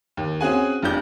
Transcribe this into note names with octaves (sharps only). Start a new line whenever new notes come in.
D#2
C4 C#4 F#4 G#4 F#5 G#5
F1 F2 D4 G6